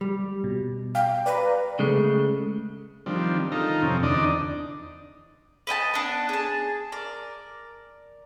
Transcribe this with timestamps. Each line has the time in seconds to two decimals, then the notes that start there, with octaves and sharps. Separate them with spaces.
0.01 G3
0.44 B2
0.95 F5 G5
1.26 B4 D5 A#5
1.79 C#3 G#3 A3
3.06 D#3 F3 G3 C4 D4
3.52 D#3 D#4 F4 A4 A#5
3.82 F2 C3 C4 C#4
4.03 E2 D3 D4 D#4 D5 D#5
5.67 B4 D#5 G5 A5
5.94 B3 D4
6.29 G#4 A5
6.92 A#4 D5